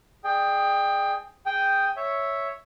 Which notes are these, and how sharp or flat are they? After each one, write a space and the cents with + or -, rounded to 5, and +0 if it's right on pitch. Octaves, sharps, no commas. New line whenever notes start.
G#4 +0 D5 +40 G5 +15
G#4 +0 G5 +0 D#6 +0
C#5 +0 E5 +0